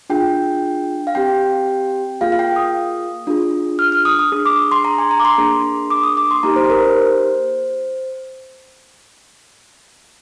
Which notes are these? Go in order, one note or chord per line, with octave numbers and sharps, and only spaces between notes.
D4 F4 G#4 G5
F5
C4 G4 G5
A#3 F4 G#4 F5
F5
G5
D#6
D4 F4 G#4
F6
F6
D#6
D#6
D4 G#4 D#6
D6
C6
A#5
G#5
A#5
D6
C6
A#3 D4 G#4
D6
D#6
D6
C6
A#3 D#4 G4 A#5
C5
A#4
C5